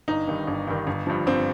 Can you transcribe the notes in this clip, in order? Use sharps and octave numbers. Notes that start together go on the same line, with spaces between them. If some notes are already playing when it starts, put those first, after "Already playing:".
G1 D#4
G2 D#3
G1
G2 D#3
G1
G2 F3
G1 C4